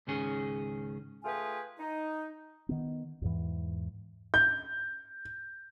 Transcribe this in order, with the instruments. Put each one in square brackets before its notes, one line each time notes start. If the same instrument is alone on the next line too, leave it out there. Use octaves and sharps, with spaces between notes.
[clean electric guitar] C#2 G#2 D#3 C#4 G#4
[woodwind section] A3 F4 G#4 B4 G5 G#5
D#4
[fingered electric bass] D#3 B3
E2 G#2 E3
[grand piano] G6